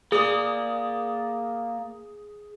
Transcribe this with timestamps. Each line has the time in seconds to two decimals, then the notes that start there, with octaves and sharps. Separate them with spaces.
0.12 A#3 G#4 D5 D#6